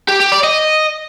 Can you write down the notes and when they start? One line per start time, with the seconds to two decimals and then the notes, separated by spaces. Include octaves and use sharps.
0.08 G4
0.20 G4
0.32 D5
0.44 D#5